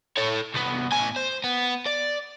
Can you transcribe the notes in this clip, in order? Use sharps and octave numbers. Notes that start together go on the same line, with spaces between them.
A4 C#5
C2 B3
A2 G#5
C5
B3
D5